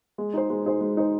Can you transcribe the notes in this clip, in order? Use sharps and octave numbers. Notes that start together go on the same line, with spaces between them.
G#3
D#4 G#4 C5
G#3
D#4 G#4 C5
G#3
D#4 G#4 C5